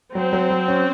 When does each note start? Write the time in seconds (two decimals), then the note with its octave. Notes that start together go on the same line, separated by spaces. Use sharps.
0.15 F#3 C4
0.33 F#3
0.50 F#3
0.68 C#4